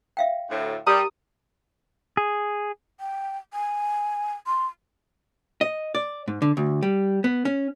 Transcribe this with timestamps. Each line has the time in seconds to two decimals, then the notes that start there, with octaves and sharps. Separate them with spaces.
0.17 E5 F5 G5
0.50 D2 A2
0.87 G3 G4 A#4 A#5 D#6
2.17 G#4
3.00 G5
3.53 G#5
4.47 C6
5.61 D#5
5.95 D5
6.28 G#2
6.42 D3
6.57 D2
6.83 G3
7.24 B3
7.45 C#4